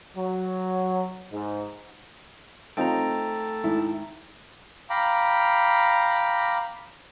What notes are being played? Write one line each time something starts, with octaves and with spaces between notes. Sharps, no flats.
F#3
G#2
A3 C4 D#4 F4 A4 G5 A#5
G#1 E4
F5 G5 A#5 B5 D6